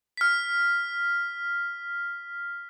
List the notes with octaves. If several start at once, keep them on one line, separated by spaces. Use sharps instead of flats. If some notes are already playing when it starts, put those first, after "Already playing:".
F6 B6